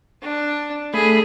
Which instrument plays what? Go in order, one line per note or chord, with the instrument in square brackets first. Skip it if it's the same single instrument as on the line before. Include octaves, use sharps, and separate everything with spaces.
[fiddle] D4
[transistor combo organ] A3 B5 [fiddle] G#4